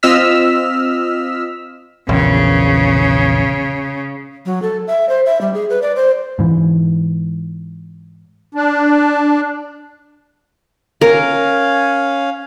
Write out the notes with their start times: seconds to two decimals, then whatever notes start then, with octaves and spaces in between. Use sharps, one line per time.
0.03 C4 F4 D#5 E6 F6 B6
2.09 A#1 E2 C#3
4.46 F#3
4.62 A4
4.87 E5
5.09 C5
5.26 E5
5.41 G3
5.54 G#4
5.70 B4
5.82 D5
5.96 C5
6.39 G#2 E3
8.55 D4
11.01 C#4 A#4 F5